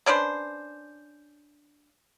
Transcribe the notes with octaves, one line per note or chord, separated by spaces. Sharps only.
C#4 D4 B4 C5